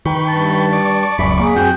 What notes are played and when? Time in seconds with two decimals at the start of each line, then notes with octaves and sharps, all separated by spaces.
0.06 D#3 B4 G5 C#6
0.28 G2 A5
0.72 D5 C#6
1.19 D1 C#2 F#2 B5
1.39 A#3 G#4
1.56 F#2 B3 C4 F#4 G5